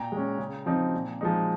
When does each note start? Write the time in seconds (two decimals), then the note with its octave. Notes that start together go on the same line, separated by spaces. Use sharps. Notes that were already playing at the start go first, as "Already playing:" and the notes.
Already playing: A#2 G5 A#5
0.12 G#3 C#4
0.38 C#3
0.66 F3 C4 D#4
0.94 A#2
1.21 F3 G#3 D#4